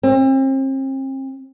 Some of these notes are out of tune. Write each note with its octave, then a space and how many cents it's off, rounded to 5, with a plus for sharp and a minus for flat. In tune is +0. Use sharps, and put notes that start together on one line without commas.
C4 +40